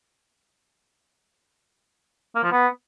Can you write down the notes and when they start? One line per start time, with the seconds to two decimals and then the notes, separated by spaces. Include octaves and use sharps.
2.35 A#3
2.43 F3
2.51 B3